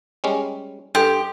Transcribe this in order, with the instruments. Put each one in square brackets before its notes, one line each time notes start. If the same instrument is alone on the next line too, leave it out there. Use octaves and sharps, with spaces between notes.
[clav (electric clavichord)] G3 G#3 C#4
[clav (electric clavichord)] G2 [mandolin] G4 [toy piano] A4 C6